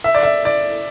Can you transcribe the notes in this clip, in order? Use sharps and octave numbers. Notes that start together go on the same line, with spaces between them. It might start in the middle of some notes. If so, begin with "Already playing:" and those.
E5
D5
E5
D5